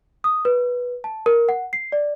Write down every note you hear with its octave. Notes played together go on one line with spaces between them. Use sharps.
D#6
B4
A5
A#4
F#5
C7
D5